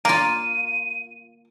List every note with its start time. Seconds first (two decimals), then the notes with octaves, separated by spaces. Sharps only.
0.05 A#3 F4 A#4 D#7